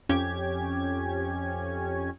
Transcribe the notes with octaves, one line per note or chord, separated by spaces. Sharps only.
F2 C#4 G4 G#6